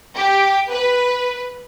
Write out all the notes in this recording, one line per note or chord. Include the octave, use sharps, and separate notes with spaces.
G4
B4